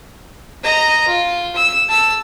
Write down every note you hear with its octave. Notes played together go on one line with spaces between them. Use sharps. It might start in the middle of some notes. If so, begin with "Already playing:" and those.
D#5 A#5
F4
E6
A5 E6